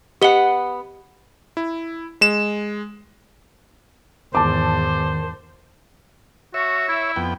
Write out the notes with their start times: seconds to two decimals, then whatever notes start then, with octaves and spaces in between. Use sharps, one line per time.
0.22 B3 G4 D#5 F#5 G7
1.57 E4
2.21 G#3 E7
4.35 E2 G#2 D#3 C5 A5 D6
6.54 F#4 C#5 E5
6.88 E4
7.16 F2 B3 G5